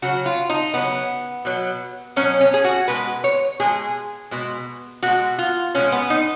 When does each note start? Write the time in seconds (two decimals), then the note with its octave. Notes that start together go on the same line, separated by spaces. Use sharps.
0.02 C#3 F#3 F#4
0.26 F4
0.50 D#4
0.73 C#3 F#3 B3
1.45 B2 F#3
2.16 B2 F#3 C#4
2.40 C#4
2.54 G#4
2.64 F#4
2.88 B2 G#3 B4
3.24 C#5
3.60 B2 G#3 G#4
4.31 B2 G#3
5.03 B2 G#3 F#4
5.39 F4
5.74 B2 G#3 C#4
5.92 B3
6.10 D#4